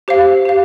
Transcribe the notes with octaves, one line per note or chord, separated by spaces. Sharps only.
G4 C5 F5
G4 C5 F5